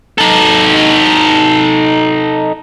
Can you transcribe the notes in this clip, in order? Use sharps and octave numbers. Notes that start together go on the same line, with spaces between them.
D#4 A4